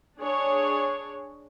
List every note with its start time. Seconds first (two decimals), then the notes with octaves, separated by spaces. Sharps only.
0.18 D4 G#4 C#5